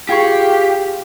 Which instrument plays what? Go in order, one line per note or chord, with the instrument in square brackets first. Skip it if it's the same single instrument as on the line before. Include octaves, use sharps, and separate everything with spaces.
[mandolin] F4 G#4 C#6 [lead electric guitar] G4